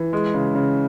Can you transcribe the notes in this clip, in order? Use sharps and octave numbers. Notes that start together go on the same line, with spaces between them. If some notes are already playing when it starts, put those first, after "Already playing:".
Already playing: E3
G#3
C#3
C#3